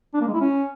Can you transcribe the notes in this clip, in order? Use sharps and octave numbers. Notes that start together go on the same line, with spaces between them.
D4
A#3
G#3
E4
C#4